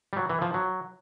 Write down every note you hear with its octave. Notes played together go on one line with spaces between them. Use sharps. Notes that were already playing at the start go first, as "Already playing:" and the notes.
G3
F#3
E3
F3
F#3